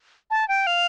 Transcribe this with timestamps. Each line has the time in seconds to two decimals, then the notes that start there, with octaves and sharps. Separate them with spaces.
0.31 A5
0.48 G5
0.67 F5